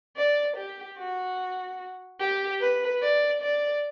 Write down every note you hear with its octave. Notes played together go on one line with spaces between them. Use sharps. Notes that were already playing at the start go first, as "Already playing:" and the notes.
D5
G4
F#4
G4
B4
D5
D5